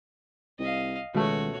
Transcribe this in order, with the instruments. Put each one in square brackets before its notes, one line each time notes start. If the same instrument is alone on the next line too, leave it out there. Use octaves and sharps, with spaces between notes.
[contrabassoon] C2 [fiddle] D#5 F5
[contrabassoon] C#2 [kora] B2 A3 [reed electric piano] D#3 G#3 [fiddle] F#4 C#5